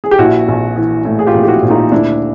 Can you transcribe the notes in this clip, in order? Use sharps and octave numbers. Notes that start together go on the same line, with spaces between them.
G#4
G4
A#1 E4 F#4
A#1
E3
A2
G#4
F4 G4
A#1
G4
E4 F#4
A#1
D#4 F4
D2 D4 E4